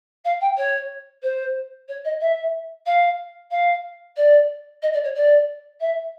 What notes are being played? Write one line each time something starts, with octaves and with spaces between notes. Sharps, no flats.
F5
G5
C#5
C5
C#5
D#5
E5
F5
F5
D5
D#5
D5
C#5
D5
E5